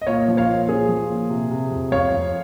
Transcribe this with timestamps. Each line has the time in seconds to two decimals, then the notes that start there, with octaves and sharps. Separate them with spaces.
0.01 D#5
0.07 A#2 C#5 F5
0.28 F3
0.37 C#5 F5
0.48 A#2
0.68 F3 G#4
0.89 F3
1.10 A#2
1.30 C3
1.51 C3
1.71 F2
1.92 F2 C#5 F5
2.12 F2